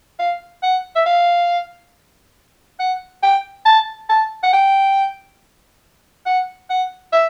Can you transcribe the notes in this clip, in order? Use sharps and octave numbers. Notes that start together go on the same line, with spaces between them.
F5
F#5
E5
F5
F#5
G5
A5
A5
F#5
G5
F#5
F#5
E5